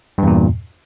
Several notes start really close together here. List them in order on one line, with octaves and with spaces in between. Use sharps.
G2 E2 A#2